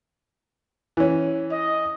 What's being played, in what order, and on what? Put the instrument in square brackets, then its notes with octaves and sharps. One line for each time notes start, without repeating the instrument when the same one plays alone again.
[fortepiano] E3 C#4
[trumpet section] D#5